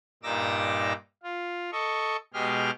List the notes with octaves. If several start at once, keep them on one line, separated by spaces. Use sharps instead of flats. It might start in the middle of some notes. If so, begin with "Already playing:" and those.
G2 A#2 D#4 D6 E6 A#6
F4
A4 D#5 C#6
B2 G#3 G4 G#4 G5 F6